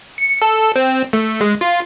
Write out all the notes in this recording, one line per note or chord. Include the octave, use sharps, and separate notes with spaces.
C#7
A4
C4
A3
G#3
F4